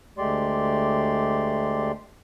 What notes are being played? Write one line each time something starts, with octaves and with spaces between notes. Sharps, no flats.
D2 G#3 A3 G4 D5 C6